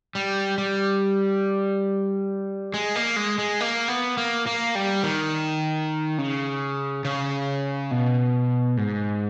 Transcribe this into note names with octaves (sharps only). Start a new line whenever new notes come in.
G3
G3
G#3
A#3
G#3
G#3
A#3
B3
A#3
A#3
G3
D#3
C#3
C#3
B2
G#2